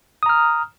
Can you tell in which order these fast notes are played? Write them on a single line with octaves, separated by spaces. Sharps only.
D#6 A#5 F6